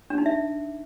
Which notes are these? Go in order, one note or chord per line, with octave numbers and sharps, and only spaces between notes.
D4
D#4
E5